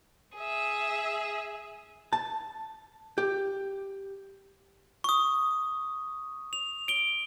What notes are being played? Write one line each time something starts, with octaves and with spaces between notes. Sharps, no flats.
G#4 E5
A5
G4
C#6 D#6
F7
D7 G7